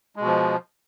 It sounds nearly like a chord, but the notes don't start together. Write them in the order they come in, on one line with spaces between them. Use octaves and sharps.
G#3 B2 F3